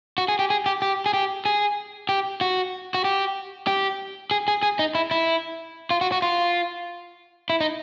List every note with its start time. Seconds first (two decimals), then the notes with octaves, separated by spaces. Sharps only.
0.18 F#4
0.28 G#4
0.39 G4
0.50 G#4
0.66 G4
0.82 G4
1.06 G#4
1.13 G4
1.45 G#4
2.09 G4
2.41 F#4
2.94 F#4
3.04 G4
3.67 G4
4.31 G#4
4.48 G#4
4.63 G#4
4.79 D#4
4.95 E4
5.11 E4
5.91 F4
6.01 F#4
6.12 F#4
6.22 F4
7.50 E4
7.61 D#4